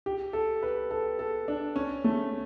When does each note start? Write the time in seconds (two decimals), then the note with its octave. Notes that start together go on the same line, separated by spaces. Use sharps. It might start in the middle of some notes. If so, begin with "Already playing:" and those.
0.06 G4
0.33 A4
0.63 B4
0.91 A4
1.19 A4
1.48 D4
1.76 C#4
2.04 A3